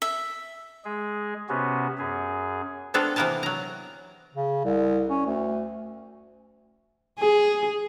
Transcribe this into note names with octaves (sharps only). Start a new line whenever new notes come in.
E5
G#3 G#4
C3 B3 C#4 F#4
F#2 G#4
B3 C4 D4 F4 A4
C3 E3 A#3 B3 A#4 A5
F#3 A#5
C#3
C2
C#4
D2
G#4